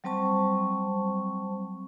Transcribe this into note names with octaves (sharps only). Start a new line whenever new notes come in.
F#3 G3 C4 C5 A5 C#6